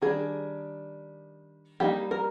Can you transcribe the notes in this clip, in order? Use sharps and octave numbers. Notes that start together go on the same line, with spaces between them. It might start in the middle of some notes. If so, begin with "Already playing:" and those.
D#3 G3 D4 G#4
G3 A#3 D#4 G4
A#4